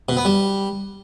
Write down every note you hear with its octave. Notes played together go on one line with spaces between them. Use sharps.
B2
B3
G3